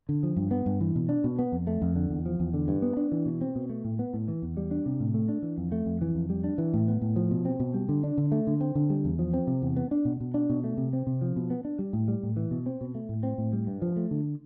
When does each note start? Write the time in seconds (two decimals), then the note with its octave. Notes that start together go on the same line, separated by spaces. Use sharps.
0.09 D3
0.23 F3
0.36 G2
0.51 B3
0.66 G2
0.81 E3
0.95 B2
1.09 D4
1.24 B2
1.39 B3
1.52 F2
1.67 A3
1.82 F2
1.95 D3
2.10 E2
2.26 F3
2.40 E2
2.54 D3
2.68 G2
2.82 B3
2.97 D4
3.12 E3
3.26 B2
3.41 C4
3.56 B2
3.70 A3
3.84 A2
3.99 B3
4.14 A2
4.28 E3
4.42 E2
4.57 G3
4.71 D4
4.86 C3
5.00 A2
5.14 A3
5.29 D4
5.42 E3
5.58 F2
5.72 A3
5.86 F2
6.01 E3
6.15 F2
6.30 G3
6.44 D4
6.58 E3
6.74 A2
6.88 B3
7.02 A2
7.16 F3
7.31 B2
7.45 C4
7.60 B2
7.74 G3
7.89 D3
8.04 D4
8.18 D3
8.32 A3
8.47 D3
8.61 C4
8.75 D3
8.90 G3
9.05 E2
9.19 F3
9.33 C4
9.47 C3
9.62 E2
9.77 B3
9.91 D4
10.05 B2
10.21 B2
10.34 D4
10.50 B2
10.64 A3
10.77 C3
10.93 C4
11.07 C3
11.22 F3
11.36 B2
11.50 B3
11.65 D4
11.79 G3
11.93 A2
12.08 G3
12.23 A2
12.36 E3
12.51 B2
12.66 C4
12.81 B2
12.95 A3
13.09 A2
13.23 C4
13.38 A2
13.53 G3
13.67 G2
13.82 F3
13.96 A3
14.11 D3